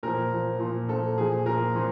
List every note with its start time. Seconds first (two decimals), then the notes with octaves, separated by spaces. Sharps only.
0.03 A#2 F3 A#4
0.32 A#2 F3
0.60 A#2 F3
0.89 A#2 F3 A4
1.17 A#2 F3 G#4
1.45 A#2 F3 A#4
1.75 A#2 F3